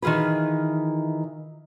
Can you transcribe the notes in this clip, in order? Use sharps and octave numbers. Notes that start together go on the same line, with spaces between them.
D#3 E3 F4 G#4 B4